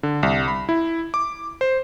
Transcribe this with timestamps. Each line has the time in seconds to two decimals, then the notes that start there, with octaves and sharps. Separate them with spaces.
0.03 D3
0.23 C2
0.48 B5
0.69 E4
1.14 D6
1.61 C5